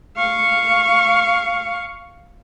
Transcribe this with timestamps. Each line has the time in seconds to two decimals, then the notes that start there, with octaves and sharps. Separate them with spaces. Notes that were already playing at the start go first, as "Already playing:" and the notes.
0.17 F5 C#6